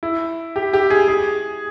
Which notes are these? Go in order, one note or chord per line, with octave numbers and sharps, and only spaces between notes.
E4
G4
G4
G#4
G#4